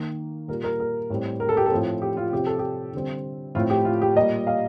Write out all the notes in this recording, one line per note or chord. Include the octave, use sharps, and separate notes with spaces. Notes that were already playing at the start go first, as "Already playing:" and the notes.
Already playing: D#3 A#3
A#2 G3 A#3 A#4
A#4
A#4
A2 G3 C4
A#4
A4
G4
A4
A2 F3 C4
G4
F4
C3 F3 C4 G4
A4
G4
D3 G3 C4
A2 F3 A3 C4 F4
G4
F4
G4
A#2 G3 A#3 D#5
F5